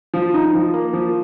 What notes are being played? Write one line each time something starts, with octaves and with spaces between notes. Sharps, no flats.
F3
D#4
F3
A#3
F3